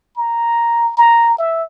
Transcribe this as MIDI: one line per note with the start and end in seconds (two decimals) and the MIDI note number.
0.17 0.94 82
0.97 1.36 82
1.39 1.63 76